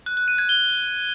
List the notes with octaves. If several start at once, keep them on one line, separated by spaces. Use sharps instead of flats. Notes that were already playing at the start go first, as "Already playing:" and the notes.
F#6
F#6
D#7
G#6
G7